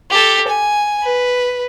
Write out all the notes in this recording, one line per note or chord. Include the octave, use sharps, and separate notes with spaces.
G4 A4
G#5
B4